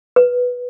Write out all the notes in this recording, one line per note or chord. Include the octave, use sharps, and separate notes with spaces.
B4